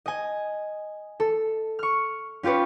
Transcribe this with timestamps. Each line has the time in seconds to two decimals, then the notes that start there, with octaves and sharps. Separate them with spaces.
0.06 D#5 G#5
1.20 A4
1.79 C#6 F6
2.43 C#4 F4 G4 B4 C#5